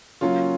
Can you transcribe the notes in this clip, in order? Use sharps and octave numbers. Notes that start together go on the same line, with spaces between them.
C#3 F#3 A#3 C#4 F4